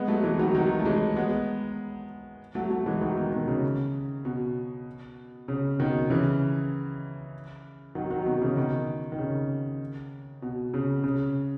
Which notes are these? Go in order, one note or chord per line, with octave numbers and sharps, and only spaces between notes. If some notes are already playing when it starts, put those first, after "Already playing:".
Already playing: G#3 B3
F#3 A3
E3 G#3
D#3 F#3
D#3 F#3
A3
E3 G#3
G#3 B3
F#3 A3
F#3 A3
E3 G#3
D#3 F#3
B2 D#3
B2 D#3
C#3
B2
C#3
B2 D#3
C#3 E3
D#3 F#3
D#3 F#3
B2 D#3
C#3 E3
B2 D#3
D#3
C#3
B2
C#3
C#3